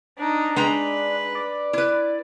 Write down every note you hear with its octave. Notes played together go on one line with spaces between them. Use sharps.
D4 D#4
G#3 D4 B4 G5 A#5
D5
E4 B4